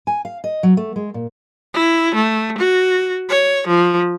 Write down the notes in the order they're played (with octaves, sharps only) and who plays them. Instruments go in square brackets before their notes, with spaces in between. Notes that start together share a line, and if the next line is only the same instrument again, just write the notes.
[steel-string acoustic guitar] G#5
F5
D#5
F#3
A3
G#3
A#2
[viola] E4
A3
F#4
C#5
F3